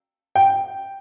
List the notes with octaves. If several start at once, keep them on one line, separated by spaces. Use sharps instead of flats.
G5